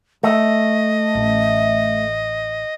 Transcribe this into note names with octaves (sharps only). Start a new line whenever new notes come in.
A3 D#5
A1